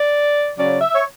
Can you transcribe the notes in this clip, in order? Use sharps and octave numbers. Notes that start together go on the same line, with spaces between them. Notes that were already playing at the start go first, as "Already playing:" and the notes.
Already playing: D5
C#3 F#3 C#4 D5
E5
C#5